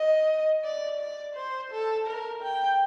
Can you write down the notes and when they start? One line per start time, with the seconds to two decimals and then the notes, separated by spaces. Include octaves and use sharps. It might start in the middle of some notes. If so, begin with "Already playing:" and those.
Already playing: D#5
0.64 D5
1.00 D5
1.35 C5
1.72 A4
2.07 A#4
2.43 G5